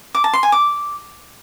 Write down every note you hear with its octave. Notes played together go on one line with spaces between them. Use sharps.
D6
A5
C6
G#5
D6